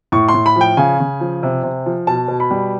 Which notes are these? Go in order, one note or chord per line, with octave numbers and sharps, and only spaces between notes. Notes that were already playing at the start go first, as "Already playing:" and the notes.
A2 C#6
C6
A2
B5
F3 G5
C#3 G#5
C#3
F3
C3
C3
F3
B2 A5
B2
B5
G3